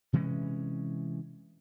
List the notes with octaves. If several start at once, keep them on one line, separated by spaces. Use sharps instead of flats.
C3 E3 G#3 C#4